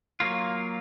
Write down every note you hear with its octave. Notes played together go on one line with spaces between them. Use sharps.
F#3 A#3 F4